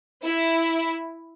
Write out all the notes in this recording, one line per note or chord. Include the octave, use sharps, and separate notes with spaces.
E4